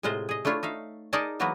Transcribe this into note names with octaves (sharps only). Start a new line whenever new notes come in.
A2 C3 G#3 F4 C5 D#5
G#4 D#5
A3 D4 E4 F4 C#5
D#4 E5 F5
D#4 G#4 A#4 D5 D#5 A5
E3 F#3 A#3 B3 F#4 B4